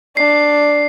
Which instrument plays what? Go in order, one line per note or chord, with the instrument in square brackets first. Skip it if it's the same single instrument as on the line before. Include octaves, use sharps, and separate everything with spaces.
[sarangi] D4 [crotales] C7